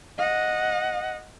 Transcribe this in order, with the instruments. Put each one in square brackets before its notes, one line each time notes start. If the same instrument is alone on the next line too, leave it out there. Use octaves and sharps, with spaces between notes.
[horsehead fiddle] D#5 F#5